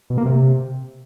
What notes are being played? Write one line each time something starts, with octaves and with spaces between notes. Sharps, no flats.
B2
A#3
C3